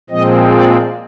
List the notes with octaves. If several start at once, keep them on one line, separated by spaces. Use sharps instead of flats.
A#2 F3 G#3 C4 D#5
D5